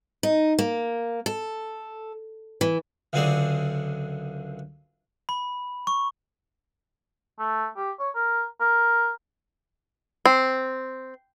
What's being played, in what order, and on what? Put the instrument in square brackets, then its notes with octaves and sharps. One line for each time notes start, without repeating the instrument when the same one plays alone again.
[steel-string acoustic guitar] D#4
A#3
A4
E3
[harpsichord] C#2 F#2 D3 C4 G#4 D5
[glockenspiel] B5
C#6
[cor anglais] A3
G4
C#5
A#4
A#4
[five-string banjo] C4